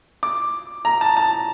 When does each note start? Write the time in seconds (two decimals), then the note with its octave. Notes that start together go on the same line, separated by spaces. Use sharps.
0.23 D6
0.85 A#5
1.01 A5
1.17 A5